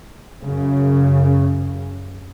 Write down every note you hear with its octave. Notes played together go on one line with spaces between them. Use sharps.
F#2 C#3